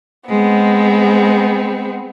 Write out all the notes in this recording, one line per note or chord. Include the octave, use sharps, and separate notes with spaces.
G#3 B3 C4